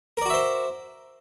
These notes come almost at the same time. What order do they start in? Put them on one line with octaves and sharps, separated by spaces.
A#4 D5 F#4 E5 C5